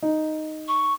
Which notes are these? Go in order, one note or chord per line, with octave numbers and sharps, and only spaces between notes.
D#4
C#6